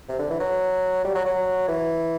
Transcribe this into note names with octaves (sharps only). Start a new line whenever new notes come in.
C3
D3
E3
F#3
G3
F#3
F#3
E3